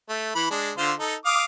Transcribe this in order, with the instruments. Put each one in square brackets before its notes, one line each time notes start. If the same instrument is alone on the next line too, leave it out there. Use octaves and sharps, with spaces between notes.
[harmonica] A3
E3 B5
G#3 D4
D3 F4 C5
D#4 A4
F5 D6 D#6